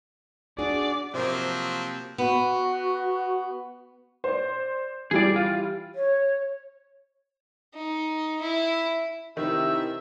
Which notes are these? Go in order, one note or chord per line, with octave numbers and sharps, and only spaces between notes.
D4 F#4 G#4 D5
C3 F3 F#3 A#3 C4
B3 F#4
C5 D5
E3 G3 G#4 D5
F4
C#5
D#4
E4
C3 D#3 E3 E4 E5